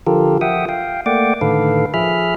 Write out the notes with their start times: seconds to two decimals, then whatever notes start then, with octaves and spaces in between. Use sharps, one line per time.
0.07 D3 F3 F4 G4 A4 A#4
0.41 F3 E5 F#5 G5 D#6
0.69 F5 G5
1.06 A3 A#3 D5 F#5 G5 D6
1.41 A2 D3 D#3 A4 B4 F5
1.94 F3 G#4 E5 B5 F6